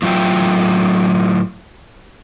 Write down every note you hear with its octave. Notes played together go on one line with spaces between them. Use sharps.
A2 F#3 F4 E5 G5